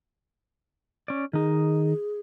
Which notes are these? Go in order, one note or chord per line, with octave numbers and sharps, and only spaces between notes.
C#4 D5
D#3 D#4 G#4